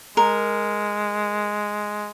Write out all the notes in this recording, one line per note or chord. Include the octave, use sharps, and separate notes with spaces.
G#3 A#4